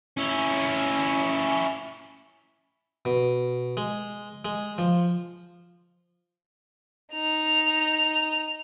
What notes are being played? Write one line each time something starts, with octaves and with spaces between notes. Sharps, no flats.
C#4 E4
B2
G#3
G#3
F3
D#4 F7